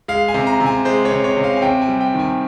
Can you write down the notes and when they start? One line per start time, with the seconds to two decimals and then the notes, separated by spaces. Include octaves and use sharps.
0.08 G#3 F5
0.28 G#5
0.34 C3
0.47 A#5
0.60 C3
0.66 G#5
0.85 G#3 C5
1.05 C#5
1.11 C3
1.24 C#5
1.37 C3
1.44 F5
1.56 G#5
1.62 C3 G5
1.82 G#5
1.88 G3
2.01 G5
2.14 D#3
2.19 G#5